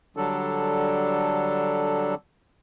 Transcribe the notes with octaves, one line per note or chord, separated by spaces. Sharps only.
D3 F#3 G3 D4 A4